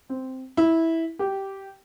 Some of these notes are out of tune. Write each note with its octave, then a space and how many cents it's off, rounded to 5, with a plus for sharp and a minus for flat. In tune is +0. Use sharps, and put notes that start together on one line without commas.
C4 -5
E4 -10
G4 -10